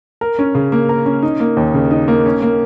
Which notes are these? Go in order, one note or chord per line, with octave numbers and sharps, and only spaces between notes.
A#4
C#4
C#3
A#3
A#4
C#4
D#4
A#3
D#2
C#3
D#4
A#3
C#4
A#3